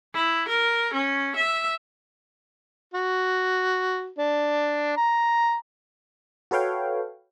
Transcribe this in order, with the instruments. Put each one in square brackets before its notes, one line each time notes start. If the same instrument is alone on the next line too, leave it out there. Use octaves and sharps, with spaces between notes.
[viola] E4
A#4
C#4
E5
[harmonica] F#4
D4
A#5
[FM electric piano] F#4 A4 B4 C#5 F5 G5